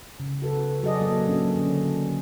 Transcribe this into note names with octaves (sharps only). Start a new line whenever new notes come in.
C#3
F#4 A4 B4
F#3 F#4 G#4 A4 D5 D#5
F#3 A#3 A4
F#3 C#4 D4
D3 C#4